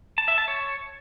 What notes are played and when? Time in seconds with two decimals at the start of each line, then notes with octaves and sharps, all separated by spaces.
0.18 A5
0.28 E5
0.38 A5
0.48 C#5